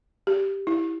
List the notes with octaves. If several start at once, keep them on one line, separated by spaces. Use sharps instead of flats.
G4
E4